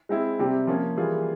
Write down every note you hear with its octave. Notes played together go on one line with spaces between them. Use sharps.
G#3 C4 E4
C3 G3 C4 G4
F3 A#3 C#4
E3 G3 A#3 F4 G#4